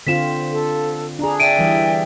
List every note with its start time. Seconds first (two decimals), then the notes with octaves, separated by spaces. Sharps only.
0.07 D3 C4 F4 B6 E7
0.50 A4
1.19 D4 G#4 A#5
1.40 D5 E5 G5 D7 D#7
1.59 E3 G3